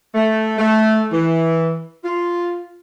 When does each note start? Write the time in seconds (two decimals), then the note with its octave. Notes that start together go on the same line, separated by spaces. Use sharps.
0.14 A3
0.58 A3
1.12 E3
2.04 F4